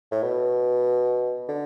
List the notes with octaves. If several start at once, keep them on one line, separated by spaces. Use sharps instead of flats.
A2
B2
D3